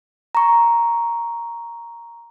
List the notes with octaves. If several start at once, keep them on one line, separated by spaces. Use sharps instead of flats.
A#5 C#6